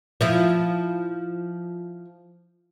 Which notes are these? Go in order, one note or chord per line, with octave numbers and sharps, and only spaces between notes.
F3 E4